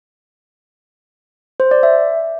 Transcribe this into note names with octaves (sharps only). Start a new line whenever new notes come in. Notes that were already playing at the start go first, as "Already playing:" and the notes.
C5
D5
E5